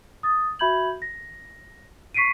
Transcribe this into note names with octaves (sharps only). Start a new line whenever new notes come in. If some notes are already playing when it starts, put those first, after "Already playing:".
D#6 A6
F#4 E5 B5 G6 G#6 F#7
A#6
C#6 B6 C7 D7 D#7